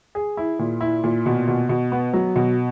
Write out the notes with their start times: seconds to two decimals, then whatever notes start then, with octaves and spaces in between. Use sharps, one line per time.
0.15 G#4
0.37 E4
0.59 A#2
0.81 E4
1.04 A#2
1.26 B2
1.48 B2
1.69 B2
1.92 B3
2.13 F#3
2.36 B2